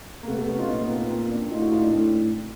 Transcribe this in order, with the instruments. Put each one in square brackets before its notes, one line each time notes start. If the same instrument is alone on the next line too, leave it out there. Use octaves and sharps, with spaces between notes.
[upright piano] A#3
[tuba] C3 [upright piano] A3 B3
[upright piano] A3 B3
B3 C#4
D#4 F4
[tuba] A#2 [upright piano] D#4 F4
[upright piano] B3
A#3 C4
A#3 C4
C4 D4
[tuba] A2 [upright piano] D#4 F4
[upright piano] E4 F#4
D#4 F4
D4 E4
[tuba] A2 [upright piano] C4 D4